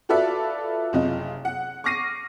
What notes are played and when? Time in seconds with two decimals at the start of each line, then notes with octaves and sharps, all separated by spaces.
0.09 F4 F#4 A4 B4 D5 E5
0.93 F#1 C3 F4 D#5
1.45 F#5
1.84 C#6 D6 F6 A#6 C7 D#7